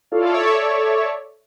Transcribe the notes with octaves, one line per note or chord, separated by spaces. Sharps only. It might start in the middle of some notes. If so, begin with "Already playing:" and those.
E4 F4 A4 C#5 D5 F5
A4 C#5 D5 E5